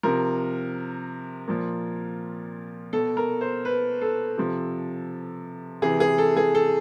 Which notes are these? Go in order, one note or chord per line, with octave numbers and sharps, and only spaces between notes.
C3 F3 A#4
A#2 F3
B2 A4
A#4
C5
B4
A4
C3 F3
C3 E3 G#4
G#4
A4
G#4
A4